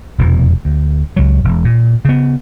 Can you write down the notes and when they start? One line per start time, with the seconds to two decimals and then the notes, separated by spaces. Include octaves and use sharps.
0.18 F1 E2 B2 E3
0.65 D2
1.16 C#2 F#3
1.44 E1
1.65 A#2
2.05 C#3 B3